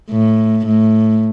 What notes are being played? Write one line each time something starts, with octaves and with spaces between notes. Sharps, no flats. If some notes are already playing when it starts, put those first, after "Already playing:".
A2
A2